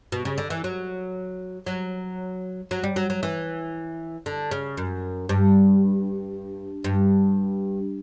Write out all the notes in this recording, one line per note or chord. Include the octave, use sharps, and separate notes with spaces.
B2
C#3
D3
E3
F#3
F#3
F#3
G3
F#3
F#3
E3
D3
C#3
F#2
G2
G2